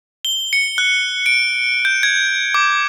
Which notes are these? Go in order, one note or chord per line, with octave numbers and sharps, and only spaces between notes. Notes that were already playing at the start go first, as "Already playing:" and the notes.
G7
C#7
F#6
D7
G6
G#6
D6